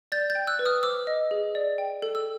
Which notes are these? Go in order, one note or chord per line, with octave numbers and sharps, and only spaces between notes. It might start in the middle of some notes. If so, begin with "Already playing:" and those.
D5 G6 A6
G6 A6
G5
E6 F#6
B4
D#6 F6
C5 D6 E6
D#5
G#4
D5
G5
A4
E6